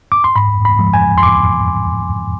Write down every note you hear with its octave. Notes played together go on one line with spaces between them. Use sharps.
D6
C6
G#2 B5
B5
F3 G#3
G#5
C6
D6